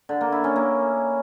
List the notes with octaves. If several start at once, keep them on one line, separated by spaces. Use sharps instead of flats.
D3
A#3
E4
C#4
A#3